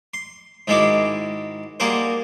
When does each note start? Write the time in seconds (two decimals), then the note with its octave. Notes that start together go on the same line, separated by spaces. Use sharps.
0.14 C6
0.67 G#2 D#3 G#3 E4 F#4 D6
1.80 G3 A#3 F#4 G#4 A#4 C5